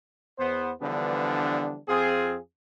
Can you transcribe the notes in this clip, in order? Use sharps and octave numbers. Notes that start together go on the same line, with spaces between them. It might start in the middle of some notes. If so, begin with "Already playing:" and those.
E2 B3 C5
D3 E3 F3 G3 B3 D4
F2 C4 F4 G#4